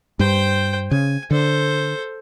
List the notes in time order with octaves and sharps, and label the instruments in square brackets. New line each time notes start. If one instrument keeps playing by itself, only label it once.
[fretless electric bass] G2 [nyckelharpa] C5 G5
[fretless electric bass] C#3 [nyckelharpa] G#5
[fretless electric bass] D3 [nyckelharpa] A4 C5